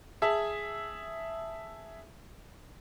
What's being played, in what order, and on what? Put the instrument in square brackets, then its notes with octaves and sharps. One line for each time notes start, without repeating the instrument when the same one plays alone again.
[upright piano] G#4 E5 A5